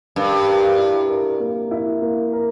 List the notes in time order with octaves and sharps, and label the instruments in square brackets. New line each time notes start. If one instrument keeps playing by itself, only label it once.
[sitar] G2 [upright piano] A#4
[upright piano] A#4
E4
A#4
A#3
E4
A#3
A#4